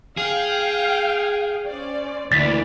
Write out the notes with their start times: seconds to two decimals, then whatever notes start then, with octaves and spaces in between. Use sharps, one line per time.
0.17 G#4 F5 G5
1.67 C#4 C5 D5
2.32 D2 E3 A#3 D5 A6 B6